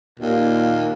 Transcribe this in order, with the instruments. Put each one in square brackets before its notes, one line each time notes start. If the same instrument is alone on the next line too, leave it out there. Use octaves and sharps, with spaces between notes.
[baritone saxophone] D#2 [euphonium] A#2